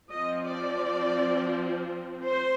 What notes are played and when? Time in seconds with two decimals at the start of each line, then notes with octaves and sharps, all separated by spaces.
0.10 F3 C4 D#5
0.46 D5
2.24 C5